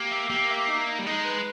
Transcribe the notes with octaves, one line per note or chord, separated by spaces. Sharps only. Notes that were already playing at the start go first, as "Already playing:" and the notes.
Already playing: A#3 G4
E5
A#3 G4
E5
D#4
D#4
G3
G#3 D#4
B4